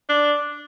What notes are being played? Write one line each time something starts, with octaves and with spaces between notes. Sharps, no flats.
D4